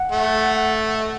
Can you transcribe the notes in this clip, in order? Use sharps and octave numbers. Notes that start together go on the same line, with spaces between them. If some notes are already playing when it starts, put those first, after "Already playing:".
Already playing: F#5
A3
D#5